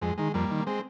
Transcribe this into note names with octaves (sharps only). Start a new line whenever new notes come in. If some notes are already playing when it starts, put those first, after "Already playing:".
F2 G#3
D#3 G#3
F2 G3 A#3
D#3
G#3 C4